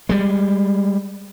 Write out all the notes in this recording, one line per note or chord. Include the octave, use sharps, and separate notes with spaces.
G3 G#3